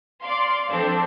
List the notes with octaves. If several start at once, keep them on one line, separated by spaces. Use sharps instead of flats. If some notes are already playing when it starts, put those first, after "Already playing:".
D5 F5 C6
F3 C4 D4 A4 C5